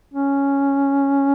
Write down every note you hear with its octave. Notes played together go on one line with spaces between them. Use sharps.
C#4